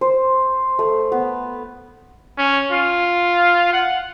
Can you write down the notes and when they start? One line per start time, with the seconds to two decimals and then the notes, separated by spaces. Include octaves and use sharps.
0.01 C5
0.79 A3
1.12 B3
2.38 C#4
2.72 F4
3.73 F#5